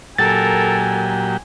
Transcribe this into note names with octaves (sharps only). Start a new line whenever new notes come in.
A#2 F#3 G4 A4 A#4 G#5 A6